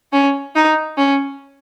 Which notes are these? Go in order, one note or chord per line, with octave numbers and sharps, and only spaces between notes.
C#4
D#4
C#4